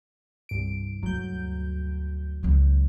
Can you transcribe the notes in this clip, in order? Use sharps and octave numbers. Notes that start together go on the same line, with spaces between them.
C2 G2 D7
D2 F#3 G6
C#2 F#3